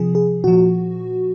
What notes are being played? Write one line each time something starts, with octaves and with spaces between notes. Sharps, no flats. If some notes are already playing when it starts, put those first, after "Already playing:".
Already playing: C3 F3 G#4
G#4
A#2 F3 F#4